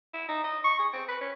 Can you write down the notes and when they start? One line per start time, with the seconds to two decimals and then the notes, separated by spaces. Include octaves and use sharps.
0.13 E4
0.29 D#4
0.44 D#5
0.64 C#6
0.79 G#4
0.93 C4
1.08 B4
1.21 C#4